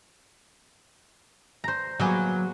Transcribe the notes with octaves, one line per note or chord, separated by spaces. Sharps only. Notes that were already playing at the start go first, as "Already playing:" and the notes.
C5 A#5
F#3 A#3 B3 G#4